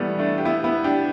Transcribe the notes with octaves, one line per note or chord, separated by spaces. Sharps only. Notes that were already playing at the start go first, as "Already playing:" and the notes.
Already playing: E3 G3 A3 B3
A3 D4
G4
B3 E4
B3 E4
D4 G4